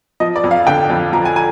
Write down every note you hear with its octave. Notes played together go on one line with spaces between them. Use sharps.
F3 D#5
D5
F2
F5
D3 G5
F2
F3 A#5
G#5
G#5